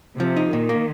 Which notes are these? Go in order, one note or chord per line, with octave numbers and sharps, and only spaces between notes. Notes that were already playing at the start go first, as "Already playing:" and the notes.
C3 F3
D#4
A#2 D#3
A#3